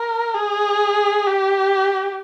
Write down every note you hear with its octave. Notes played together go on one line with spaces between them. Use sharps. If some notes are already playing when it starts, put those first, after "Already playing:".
Already playing: A#4
G#4
G4